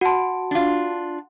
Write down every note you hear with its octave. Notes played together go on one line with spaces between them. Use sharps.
F#4 F#5 A5 C6
D4 F4